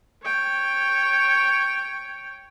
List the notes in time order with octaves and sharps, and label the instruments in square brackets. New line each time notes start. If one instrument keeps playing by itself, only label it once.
[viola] C#5 G5